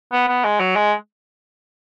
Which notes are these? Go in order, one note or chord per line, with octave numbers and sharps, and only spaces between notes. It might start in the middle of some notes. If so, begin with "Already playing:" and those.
B3
B3
G#3
F#3
G#3